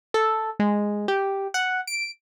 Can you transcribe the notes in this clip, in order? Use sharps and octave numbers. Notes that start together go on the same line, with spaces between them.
A4
G#3
G4
F#5
D7